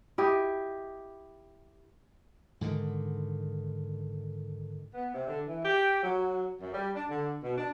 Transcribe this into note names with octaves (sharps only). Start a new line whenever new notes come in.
E4 G4 D#5
G#2 D3 D#3
B3
C3
D3
E3
G4
F#3
F#2
G3
D4
D3
B2
D4